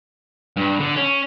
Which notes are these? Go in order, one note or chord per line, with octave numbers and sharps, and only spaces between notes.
G2
D3
C#4